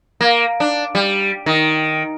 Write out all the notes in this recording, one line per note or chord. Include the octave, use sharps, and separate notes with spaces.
A#3
D4
G3
D#3